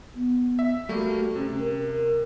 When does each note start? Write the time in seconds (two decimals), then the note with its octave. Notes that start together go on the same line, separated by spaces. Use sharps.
0.14 B3
0.59 E5
0.89 G3 A3 A#3 F#4
1.36 C3 C#4
1.59 A#4